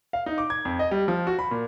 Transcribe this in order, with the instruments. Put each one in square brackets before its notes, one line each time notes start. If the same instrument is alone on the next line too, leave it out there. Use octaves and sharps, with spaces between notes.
[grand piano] F5
D#4
D6
G#6
F2
D#5
G3
F3
F#4
B5
A#2